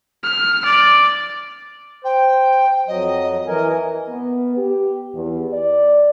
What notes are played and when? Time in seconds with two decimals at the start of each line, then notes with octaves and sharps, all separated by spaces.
0.23 F6
0.65 D5
2.04 C5 G5
2.87 F2 F#3 D#5
3.47 E3 A#4 D#5 G#5
4.09 B3
4.57 G4
5.14 E2
5.53 D5